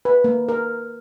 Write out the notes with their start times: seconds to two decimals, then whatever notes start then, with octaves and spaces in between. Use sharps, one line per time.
0.05 B4
0.24 A#3
0.49 A#4